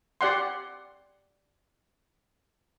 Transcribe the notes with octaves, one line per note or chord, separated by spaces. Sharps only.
G4 D5 F#5 C6